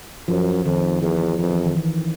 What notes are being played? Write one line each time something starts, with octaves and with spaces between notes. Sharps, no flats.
F#2 F3
F2 D#3
E2 F3
F2 F3
E3
D#3
E3